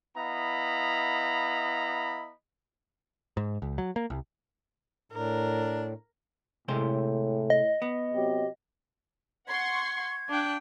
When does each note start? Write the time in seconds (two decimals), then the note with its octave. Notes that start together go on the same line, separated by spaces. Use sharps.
0.17 B3 E4 D#5 F5 A#5 B5
3.37 G#2
3.62 C#2
3.78 F#3
3.96 A#3
4.10 C2
5.12 A2 D4 A#4
6.68 A2 C3 G#3 C5
7.50 D#5
7.82 B3
8.14 C3 F#3 G4
9.48 F#5 C6 C#6 G#6
10.29 D4 F5 G5 F#6